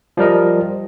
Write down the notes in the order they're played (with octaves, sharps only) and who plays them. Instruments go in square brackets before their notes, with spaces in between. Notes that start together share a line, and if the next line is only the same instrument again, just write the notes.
[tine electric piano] F3 G3 A#4 D#5